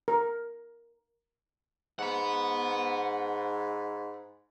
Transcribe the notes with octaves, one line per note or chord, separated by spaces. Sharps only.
A#4
G#2 F#5 B5